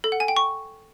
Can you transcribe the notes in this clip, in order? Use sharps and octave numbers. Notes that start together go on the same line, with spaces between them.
A4
F#5
G#5
G5
C#6